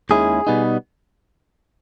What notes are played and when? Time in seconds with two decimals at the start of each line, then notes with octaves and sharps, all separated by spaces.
0.10 D#2 D#3 G#3 C#4 E4 G#4
0.47 B2 G3 B3 D#4